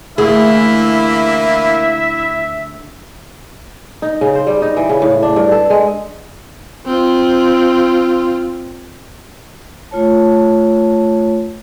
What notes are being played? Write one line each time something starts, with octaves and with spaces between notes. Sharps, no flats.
D2 E3 A#3 E4 G#4 E5 B5
D#4
C#3
C5
G3
D#4
E3
C#3
A2
D4
G2
A4
G#3
C4 F4
A3 F4 C#5 A5